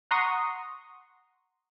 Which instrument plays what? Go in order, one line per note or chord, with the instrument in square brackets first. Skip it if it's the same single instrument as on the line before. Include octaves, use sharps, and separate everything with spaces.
[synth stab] F#5 A#5 C6 C#6 D#6